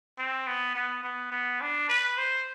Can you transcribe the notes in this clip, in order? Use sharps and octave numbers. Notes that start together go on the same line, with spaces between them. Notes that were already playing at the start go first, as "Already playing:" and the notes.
C4
B3
B3
B3
B3
D4
B4
C5